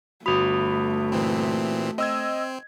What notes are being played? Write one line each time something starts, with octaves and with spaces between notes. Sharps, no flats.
G1 A3 F#4 B5 D#6 F7
A#2 E3 C4
C4 D#5 E6 G#6